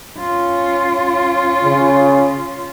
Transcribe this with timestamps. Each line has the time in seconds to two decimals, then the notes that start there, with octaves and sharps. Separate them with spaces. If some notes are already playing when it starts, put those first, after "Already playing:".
0.19 C#4 F4
1.64 C#3